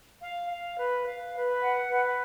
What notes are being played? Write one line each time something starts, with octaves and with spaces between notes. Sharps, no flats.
F5
F5
B4
F5
B4
F#5
B4